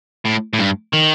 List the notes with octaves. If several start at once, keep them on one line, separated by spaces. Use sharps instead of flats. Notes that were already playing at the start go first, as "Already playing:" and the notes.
A2
A2
G2
D#3